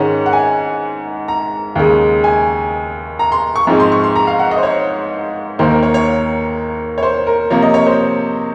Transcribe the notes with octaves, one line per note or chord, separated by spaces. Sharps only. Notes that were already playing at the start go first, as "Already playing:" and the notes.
Already playing: G#2 D#3 G#3 C#4 F#5
F#5
G#5
A#5
D#2 C#3 G#3
G#5
A#5
C6
C#6
G#2 F3 G#3 C4 D#4
C6
C#6
C6
A#5
F5
F#5
D#5
C5
C#5
D#2 D#3 A#3 C5
A#4
C#5
C#5
C#5
C5
A#4
C3 F3 A#3 C#5
D#5
C#5
C5